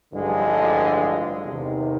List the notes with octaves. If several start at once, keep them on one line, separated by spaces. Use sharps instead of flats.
A1 G2 D3 F3 G#3
E2 C3 D#3